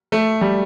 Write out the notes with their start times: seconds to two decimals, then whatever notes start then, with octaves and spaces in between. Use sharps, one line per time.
0.12 A3
0.41 G3